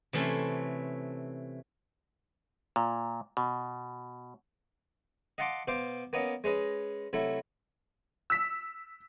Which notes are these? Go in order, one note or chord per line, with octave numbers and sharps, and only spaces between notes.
C3 E3 A3 C#4 G#5 C6
A#2
B2
D#5 F5 F#5 A5 C6 D6
B2 C5 F5 D6
A#3 B3 C#4 D#5
G#3 C#4 B4 D#5
C2 F#3 A3 E4
E6 B6